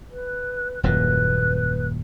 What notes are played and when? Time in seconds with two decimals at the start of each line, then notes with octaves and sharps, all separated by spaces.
0.10 B4
0.83 D#1 F#2 A#2 B4